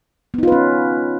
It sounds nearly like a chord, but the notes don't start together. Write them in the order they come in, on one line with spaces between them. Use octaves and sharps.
B3 D#4 F4 B4 C#4